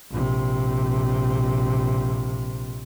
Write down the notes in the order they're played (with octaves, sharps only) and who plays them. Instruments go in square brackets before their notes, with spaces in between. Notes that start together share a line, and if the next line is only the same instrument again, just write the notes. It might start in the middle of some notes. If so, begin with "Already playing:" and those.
[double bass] A#1 C3